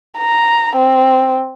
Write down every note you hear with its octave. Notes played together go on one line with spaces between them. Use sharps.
A#5
C4